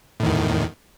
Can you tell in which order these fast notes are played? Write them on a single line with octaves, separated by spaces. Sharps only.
A2 D#3 E2